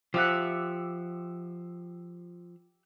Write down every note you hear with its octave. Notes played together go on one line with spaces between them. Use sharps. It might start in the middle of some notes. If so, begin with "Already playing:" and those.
F3 G4 E5 F#5